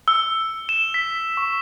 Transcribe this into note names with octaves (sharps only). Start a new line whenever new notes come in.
E6
E7
B6
C#6